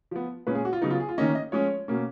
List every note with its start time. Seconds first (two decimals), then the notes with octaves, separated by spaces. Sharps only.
0.11 F3 B3
0.47 A#2 G#3 C#4 B4
0.55 G#4
0.65 F#4
0.73 F4
0.82 C#3 F#3 B3 D#4
0.90 F4
1.00 G#4
1.09 F4
1.18 D#3 A#3 C#4 D#5
1.35 D#5
1.52 F3 G#3 C#4 C#5
1.88 B2 A#3 C#4